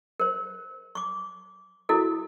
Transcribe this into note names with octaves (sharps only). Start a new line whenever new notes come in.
A#4 C5
C#6 D6
E4 F#4 A4 A#4